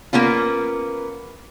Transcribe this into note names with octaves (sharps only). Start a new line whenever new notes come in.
A#3 B3 C#4 F4